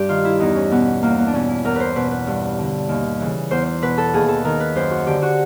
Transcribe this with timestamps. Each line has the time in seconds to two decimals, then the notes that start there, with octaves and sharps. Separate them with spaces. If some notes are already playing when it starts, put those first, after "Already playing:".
Already playing: G2 G4
0.09 D#3 F4
0.25 E4
0.39 E2 D#4
0.55 C#4
0.71 B2 B3
1.03 E2 A#3
1.18 B3
1.27 D4
1.34 B2 C#4
1.49 E4
1.65 E2 A#4
1.76 B4 C5
1.96 B2 B4
2.11 B4
2.27 G2
2.58 D3
2.89 D#2
3.20 C#3 E3
3.51 E2 C5
3.66 C5
3.82 B2 B4
3.98 A4
4.13 D#2 G#4
4.28 A4
4.45 D#3 A#4
4.60 B4
4.76 F#2 C5
4.91 F#4
5.07 D3 G4
5.22 F#4